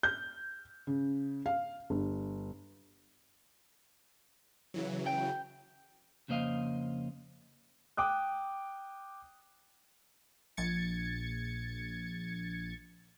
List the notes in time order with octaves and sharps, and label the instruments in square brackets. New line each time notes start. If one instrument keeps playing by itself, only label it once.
[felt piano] G6
C#3
F5
G1
[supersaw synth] C#3 E3 F#3
[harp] G5
[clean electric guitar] F2 C#3 A#3 C5 D#5 F5
[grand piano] G5 D6 D#6 F#6
[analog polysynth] A#1 G#6 A6 C#7